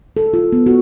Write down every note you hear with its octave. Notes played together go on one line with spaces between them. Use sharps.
A4
F4
B3
F#4